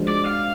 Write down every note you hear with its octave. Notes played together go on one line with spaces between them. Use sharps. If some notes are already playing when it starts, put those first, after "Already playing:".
Already playing: F3 G#3 D4 F#4
D5
F5